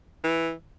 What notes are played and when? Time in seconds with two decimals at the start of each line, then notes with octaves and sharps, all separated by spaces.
0.24 E3